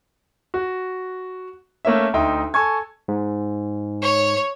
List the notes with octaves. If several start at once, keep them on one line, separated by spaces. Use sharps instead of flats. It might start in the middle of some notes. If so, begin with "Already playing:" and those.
F#4
A3 A#3 C#4 E5
D2 D#4 E5 G5 C6
A4 G#5 C#6 G#6
G#2
C#5